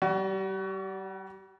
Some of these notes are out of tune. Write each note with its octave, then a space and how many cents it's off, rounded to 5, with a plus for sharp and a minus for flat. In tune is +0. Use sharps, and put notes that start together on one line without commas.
G3 -30 F#4 +20